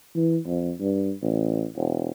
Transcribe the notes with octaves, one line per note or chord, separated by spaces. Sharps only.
E3
F2
G2
A1
E1